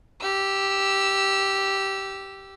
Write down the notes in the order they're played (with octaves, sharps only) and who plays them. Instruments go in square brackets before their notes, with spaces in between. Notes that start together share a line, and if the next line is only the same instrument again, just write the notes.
[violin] G4 E6